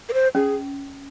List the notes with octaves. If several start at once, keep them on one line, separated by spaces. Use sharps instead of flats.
A#4
C5
C#4 G#4